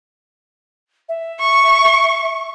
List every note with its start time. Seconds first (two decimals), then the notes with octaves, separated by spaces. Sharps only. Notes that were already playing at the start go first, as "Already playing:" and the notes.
1.09 E5
1.39 C#6